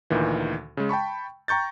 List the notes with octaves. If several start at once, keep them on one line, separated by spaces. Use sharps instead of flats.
D2 A#2 D#3 E3
C#3 G#3
G5 A5 B5 C#6
G5 A#5 C#6 G6 A6